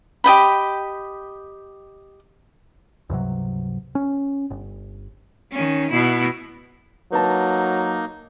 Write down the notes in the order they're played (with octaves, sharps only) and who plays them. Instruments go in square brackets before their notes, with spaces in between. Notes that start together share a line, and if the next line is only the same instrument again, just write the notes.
[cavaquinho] G4 D#5 G5 B5
[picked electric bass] C#2 G2 C3 F#3
C#4
G1
[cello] D#3 C#4
B2 E4
[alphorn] F#3 [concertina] A#3 D#4 [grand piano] B4 A5